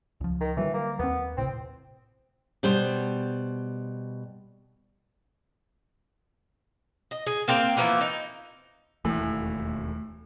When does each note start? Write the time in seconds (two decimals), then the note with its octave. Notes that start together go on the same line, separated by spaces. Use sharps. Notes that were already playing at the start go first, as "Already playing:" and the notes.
0.21 C#2 F3
0.41 D#3
0.57 D3 E3 F#3 G3
0.74 A#3
0.99 D#2 B3 C4
1.37 A1 A2 C3 C4
2.63 B2 G3 C5
7.11 D#5
7.27 G#4
7.48 A#3 C4 A#4
7.77 E3 F3 A#3 B3
8.01 D#4
9.05 E1 D#2 A2 E3 A3